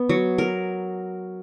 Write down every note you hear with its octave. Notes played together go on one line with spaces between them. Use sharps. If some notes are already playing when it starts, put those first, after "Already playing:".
Already playing: B3
F#3
A#4